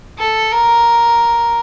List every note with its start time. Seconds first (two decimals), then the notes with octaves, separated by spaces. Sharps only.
0.19 A4
0.52 A#4